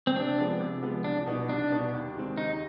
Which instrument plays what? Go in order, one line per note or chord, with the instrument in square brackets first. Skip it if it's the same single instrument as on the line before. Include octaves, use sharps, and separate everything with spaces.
[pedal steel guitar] C4
[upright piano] C3 [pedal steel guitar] D4
[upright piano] F3 G#3 B3
C3
F3 G#3 B3
[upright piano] C2 [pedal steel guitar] D4
[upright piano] B2 B3 D#4
[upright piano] C2 [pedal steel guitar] D4
[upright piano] B2 B3 D#4
D#2
D#3 G#3 C4
[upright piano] D#2 [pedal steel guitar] D#4